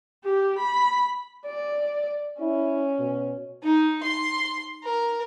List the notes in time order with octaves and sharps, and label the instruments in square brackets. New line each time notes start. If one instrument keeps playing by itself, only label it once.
[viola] G4
B5
[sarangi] D5
[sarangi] C#4 [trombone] E4
[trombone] B2
[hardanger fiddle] D#4
C6
A#4